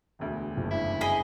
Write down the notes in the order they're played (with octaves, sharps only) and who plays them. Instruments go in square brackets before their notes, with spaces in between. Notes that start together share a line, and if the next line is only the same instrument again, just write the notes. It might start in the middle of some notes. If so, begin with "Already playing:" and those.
[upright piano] E1 D2
[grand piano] F#1 G2
[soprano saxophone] E4
[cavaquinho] G#4 D#5 B5